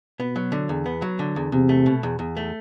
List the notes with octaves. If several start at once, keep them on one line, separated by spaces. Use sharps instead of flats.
B2 B3
F#3
D3
E2
B3
F#3
D3
E2
E2 C3
A3
B2
E2
E2
A3